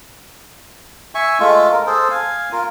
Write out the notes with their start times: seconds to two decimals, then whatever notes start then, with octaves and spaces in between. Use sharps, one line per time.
1.15 E5 G#5 C#6
1.40 G#3 A3 F4
1.72 A#4
1.87 G#4 A4 C5
2.11 F5 G#5
2.52 F4 A#4